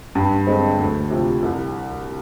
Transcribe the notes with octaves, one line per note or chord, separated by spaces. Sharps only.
G2
D3 G#3 C4
D2
C3 F3
C2